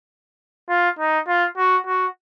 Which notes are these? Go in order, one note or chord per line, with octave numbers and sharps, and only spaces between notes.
F4
D#4
F4
F#4
F#4